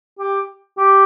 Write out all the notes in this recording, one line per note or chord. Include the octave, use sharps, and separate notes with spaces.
G4
G4